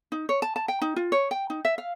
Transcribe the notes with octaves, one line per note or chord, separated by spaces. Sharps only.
D#4
C#5
A5
A5
G5
D#4
F4
C#5
G5
D#4
E5
F5